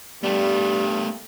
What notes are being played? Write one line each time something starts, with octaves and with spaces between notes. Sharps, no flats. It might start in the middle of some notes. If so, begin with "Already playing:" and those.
G2 G3 A3 B3